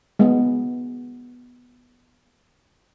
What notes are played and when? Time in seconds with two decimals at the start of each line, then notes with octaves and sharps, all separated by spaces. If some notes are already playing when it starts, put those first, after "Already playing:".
0.19 G#3 B3